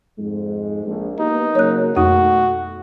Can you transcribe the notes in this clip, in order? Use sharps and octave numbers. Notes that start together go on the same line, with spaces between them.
F2 G#2 G#3
A#1
A#3 B3 D#4 G4
C#3 F#3 A#3 C#5 F#6
F2 B2 A3 D#4 F#4 D#6